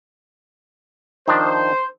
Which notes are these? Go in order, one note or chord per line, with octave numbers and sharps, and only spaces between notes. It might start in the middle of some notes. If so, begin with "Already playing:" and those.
D#3 F3 D4 C5